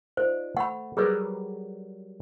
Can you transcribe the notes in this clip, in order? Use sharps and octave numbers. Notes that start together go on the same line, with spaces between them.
D#4 F4 C5 D5
A3 F#5 B5
F#3 G3 G#4 A#4 B4